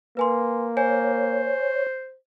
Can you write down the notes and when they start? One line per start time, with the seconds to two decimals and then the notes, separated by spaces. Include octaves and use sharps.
0.17 A#3 B4 G#5 C6
0.77 C5 C#5 G#5